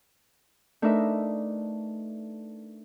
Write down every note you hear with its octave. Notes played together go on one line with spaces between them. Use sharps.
A3 D4 D#4 A#4 B4 E5